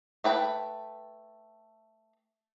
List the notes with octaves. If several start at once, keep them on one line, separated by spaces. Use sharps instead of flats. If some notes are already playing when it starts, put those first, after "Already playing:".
A3 B4 G5 B5